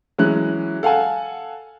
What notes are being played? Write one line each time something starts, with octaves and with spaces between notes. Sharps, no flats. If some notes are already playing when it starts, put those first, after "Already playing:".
E3 F#3 G#3 C#4 F#6
A4 F5 F#5 G#5 A5